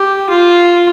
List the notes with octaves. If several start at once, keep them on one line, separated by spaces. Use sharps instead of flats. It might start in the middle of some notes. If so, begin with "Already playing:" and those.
Already playing: G4
F4